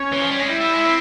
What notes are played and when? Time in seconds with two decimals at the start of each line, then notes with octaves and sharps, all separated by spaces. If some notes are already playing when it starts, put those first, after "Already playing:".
Already playing: C#4 C#5
0.12 E3
0.21 F3
0.30 G3
0.40 G#3
0.48 G3 E4 E5
0.60 G3
0.73 G#3
0.85 C4